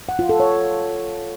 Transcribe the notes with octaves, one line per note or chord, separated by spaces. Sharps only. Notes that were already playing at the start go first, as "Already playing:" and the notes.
F#5
F4
A4
C#5